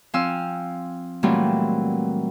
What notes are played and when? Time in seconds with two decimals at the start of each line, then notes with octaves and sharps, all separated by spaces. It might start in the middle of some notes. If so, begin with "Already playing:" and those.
0.14 F3 C4 F5 G#5 E6
1.23 A#2 E3 F#3 G3 A3 C4